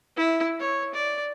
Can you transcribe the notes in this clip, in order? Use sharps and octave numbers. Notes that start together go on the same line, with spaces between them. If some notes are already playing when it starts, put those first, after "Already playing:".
E4
C#5
D5